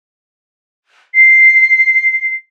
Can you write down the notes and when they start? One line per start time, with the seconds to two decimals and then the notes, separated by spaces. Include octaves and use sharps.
1.14 C7